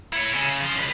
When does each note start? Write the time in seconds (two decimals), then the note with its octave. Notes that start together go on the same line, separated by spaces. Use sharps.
0.13 E4 C#5
0.34 C#3
0.60 F3 F4
0.76 C#2 B4